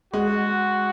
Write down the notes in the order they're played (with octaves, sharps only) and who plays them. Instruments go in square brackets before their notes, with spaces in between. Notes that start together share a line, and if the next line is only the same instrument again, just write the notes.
[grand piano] G#3 [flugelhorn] F#4